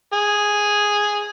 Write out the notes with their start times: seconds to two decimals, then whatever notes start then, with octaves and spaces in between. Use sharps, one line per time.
0.13 G#4